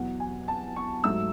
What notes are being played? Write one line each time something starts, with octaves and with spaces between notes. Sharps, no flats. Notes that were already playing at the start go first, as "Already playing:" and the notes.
Already playing: E2 B2 F#3 F#5
G#5
A5
C#6
G#2 F#3 A3 E6